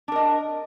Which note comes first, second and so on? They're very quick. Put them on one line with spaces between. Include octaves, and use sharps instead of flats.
D4 A#4 D#5